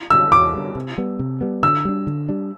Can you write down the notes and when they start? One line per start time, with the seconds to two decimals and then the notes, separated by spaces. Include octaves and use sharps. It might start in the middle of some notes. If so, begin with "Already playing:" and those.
0.10 D3 G3 E6
0.32 E2 D6
0.54 D3 G3
0.75 C3
0.98 G3 B3
1.19 C3
1.41 G3 B3
1.63 D3 E6
1.85 G3 D4
2.07 D3
2.29 G3 D4